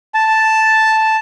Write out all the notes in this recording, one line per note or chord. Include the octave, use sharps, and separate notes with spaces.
A5